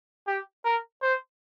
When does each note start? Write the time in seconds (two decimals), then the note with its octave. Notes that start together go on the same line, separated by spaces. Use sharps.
0.27 G4
0.65 A#4
1.02 C5